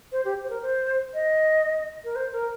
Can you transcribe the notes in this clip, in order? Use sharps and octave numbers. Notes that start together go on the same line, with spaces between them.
C5
G4
C5
A#4
C5
D#5
A#4
C5
A#4